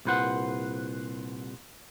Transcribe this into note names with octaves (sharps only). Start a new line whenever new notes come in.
C2 A#2 B4 C5 F#5